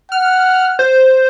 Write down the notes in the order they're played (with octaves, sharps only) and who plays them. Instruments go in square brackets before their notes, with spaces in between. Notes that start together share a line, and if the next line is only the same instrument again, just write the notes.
[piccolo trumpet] F#5 [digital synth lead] F6
[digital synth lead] C5